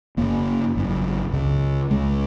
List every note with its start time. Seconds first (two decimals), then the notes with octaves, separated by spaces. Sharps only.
0.17 F#1 F#2 C#3 A#3
0.75 G#1 F#2 C#3
1.32 C#2 C#3
1.90 C#2 C#3 G#3